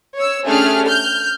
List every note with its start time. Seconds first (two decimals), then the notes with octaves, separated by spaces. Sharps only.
0.17 C#5 E6
0.46 A3 C#4 D4 G4 G#4 F6
0.86 F6 G6